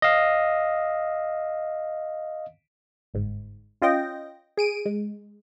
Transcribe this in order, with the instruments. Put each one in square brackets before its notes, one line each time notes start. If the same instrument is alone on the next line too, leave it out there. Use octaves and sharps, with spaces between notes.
[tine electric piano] D#5 F5
[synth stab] G1 G#2
C#4 F4 D#5 G5 A#6
G#4 D7 D#7
G#3